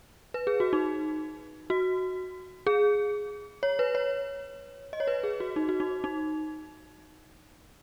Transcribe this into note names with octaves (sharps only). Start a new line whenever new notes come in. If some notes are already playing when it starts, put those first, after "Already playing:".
B4
G#4
F#4
D#4
F#4
G#4
C#5
B4
C#5
D#5
C#5
B4
G#4
F#4
D#4
F#4
D#4
D#4